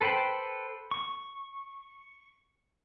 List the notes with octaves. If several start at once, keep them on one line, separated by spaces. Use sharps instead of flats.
A4 B4 C5 G5 B5
C#6